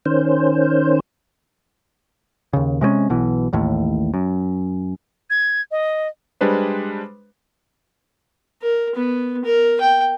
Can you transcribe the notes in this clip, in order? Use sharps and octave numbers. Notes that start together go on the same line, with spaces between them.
D#3 C#4 C5
D#2 C#3
C3 G#3 A#3 C#4
B1 B2 E3
A1 D#2 A2
F#2
G#6
D#5
G3 G#3 D4 B4 C5
A#4
B3
A#4
G5